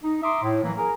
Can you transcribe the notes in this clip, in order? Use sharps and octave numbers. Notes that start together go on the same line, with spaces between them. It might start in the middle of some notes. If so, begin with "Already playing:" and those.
D#4
E5 A#5 C6 D6 D#6
A2
E3 F#3 A#3
G#4 A#4